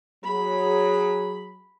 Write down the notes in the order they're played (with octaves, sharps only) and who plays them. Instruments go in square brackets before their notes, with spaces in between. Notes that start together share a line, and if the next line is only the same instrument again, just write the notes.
[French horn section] F#3 G#4 [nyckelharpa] B5